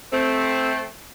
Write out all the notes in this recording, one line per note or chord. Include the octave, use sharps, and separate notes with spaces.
A3 C4